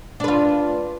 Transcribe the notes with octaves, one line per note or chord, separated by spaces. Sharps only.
D4 F4 B4